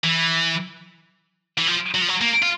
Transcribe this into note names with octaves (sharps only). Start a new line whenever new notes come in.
E3
E3
F3
F#3
F3
F#3
A#3
F4